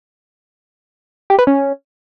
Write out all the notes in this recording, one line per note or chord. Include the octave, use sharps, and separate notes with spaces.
G4
B4
C#4